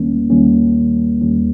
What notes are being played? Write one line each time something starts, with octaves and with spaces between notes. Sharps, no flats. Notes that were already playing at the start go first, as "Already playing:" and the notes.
Already playing: D#2 D#3 G3 A#3 C#4
D#2 D#3 G3 A#3 C#4
D#2 D#3 G3 A#3 C#4